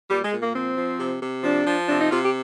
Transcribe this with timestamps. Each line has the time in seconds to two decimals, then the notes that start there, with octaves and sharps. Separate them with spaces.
0.10 A#2 G3
0.24 G#3
0.32 A#2
0.40 A#3
0.54 F3 C4
0.77 F3
0.99 C3
1.22 C3
1.43 F3 D4
1.66 F3
1.88 C3 D4
2.00 D#4
2.11 C3 F4
2.22 G4